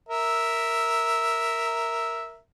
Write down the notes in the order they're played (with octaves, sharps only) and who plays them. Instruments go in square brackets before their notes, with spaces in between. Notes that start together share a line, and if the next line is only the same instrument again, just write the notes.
[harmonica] A#4 E5